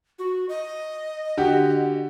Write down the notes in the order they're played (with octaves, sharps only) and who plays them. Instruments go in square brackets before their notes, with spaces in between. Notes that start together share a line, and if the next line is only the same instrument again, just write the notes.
[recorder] F#4
D#5
[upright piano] D3 F#4 G4